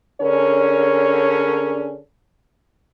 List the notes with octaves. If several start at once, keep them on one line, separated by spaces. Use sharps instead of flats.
D3 C#4 D4 G#4 A#4 C#5